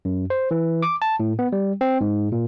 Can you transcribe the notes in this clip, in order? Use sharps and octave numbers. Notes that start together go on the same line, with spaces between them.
F#2
C5
E3
D6
A5
A2
B3
G3
C4
G#2
A#2